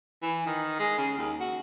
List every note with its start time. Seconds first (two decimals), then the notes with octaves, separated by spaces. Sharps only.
0.22 E3
0.46 D#3
0.79 G#3
0.98 C#3
1.18 D#2
1.40 F#4